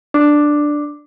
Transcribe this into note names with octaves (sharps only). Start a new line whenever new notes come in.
D4